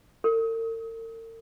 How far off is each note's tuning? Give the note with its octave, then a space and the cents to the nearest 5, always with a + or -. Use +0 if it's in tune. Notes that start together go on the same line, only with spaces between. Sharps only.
A#4 -45